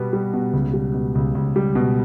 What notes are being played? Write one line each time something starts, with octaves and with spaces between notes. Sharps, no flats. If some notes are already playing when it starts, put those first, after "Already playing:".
Already playing: B2 G3 B3 F#4
G3
B2
C#2
G3
B2
C#2
C#2
G3
B2